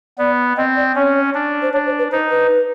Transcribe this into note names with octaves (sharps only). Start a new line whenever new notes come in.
B3 D5
C4 D#5
D5
C#4 C#5
D4
C5
D4 C#5
C5
B4
D#4 C5
B4